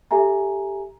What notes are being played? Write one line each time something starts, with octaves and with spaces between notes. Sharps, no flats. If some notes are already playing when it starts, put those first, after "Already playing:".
G4 A4 E5 G#5 A#5